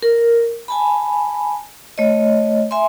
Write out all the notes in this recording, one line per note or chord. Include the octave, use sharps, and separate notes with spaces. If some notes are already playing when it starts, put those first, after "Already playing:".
A#4
G#5 A5 B5
A3 C#5 D#5
E5 G#5 C6